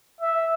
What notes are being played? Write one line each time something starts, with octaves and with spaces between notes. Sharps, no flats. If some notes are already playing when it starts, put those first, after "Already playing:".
E5